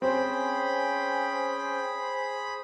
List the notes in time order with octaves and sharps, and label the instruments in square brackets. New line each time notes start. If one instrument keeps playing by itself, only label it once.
[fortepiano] C4 [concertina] C#4 G5 [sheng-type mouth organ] G#4 B5 [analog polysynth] C5